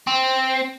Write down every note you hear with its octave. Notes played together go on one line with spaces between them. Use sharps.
C4